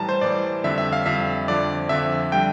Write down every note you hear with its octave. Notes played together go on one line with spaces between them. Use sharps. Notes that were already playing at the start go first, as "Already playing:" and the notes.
Already playing: A2 E3 G3 A5 A#5
C5
A2 E3 G3 D5
F2 D3 G3 E5
E5
F5
F2 D3 G3 E5
F2 D3 F3 D5
F2 D3 F3 E5
D3 G3 G5